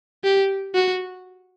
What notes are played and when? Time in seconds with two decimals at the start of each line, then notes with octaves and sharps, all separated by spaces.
0.24 G4
0.75 F#4